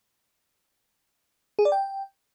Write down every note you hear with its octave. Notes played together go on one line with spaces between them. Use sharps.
G#4
D5
G5